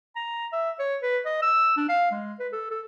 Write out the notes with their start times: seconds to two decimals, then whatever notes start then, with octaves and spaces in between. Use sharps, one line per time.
0.16 A#5
0.52 E5
0.79 C#5
1.02 B4
1.26 D#5
1.42 E6
1.77 D4
1.89 F5
2.11 G#3
2.39 B4
2.52 A4
2.71 A4